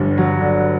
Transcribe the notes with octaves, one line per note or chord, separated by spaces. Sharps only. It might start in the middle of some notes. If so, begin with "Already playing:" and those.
Already playing: G1 G2 D3
F#3
D3